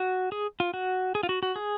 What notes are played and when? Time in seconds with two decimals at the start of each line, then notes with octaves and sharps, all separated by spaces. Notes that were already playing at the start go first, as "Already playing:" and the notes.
Already playing: F#4
0.32 G#4
0.60 F4
0.74 F#4
1.15 G#4
1.23 F4
1.29 F#4
1.43 F#4
1.56 G#4